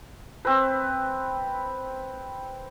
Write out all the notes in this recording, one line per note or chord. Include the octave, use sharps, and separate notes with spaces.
C4 B4